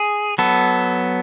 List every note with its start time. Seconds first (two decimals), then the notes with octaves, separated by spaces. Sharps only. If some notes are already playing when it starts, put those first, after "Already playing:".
Already playing: G#4
0.38 F#3 B3 A4